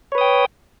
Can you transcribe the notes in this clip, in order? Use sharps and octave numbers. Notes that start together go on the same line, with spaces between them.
B4 C#5 G5 D#6